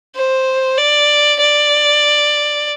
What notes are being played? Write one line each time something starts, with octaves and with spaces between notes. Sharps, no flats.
C5
D5
D5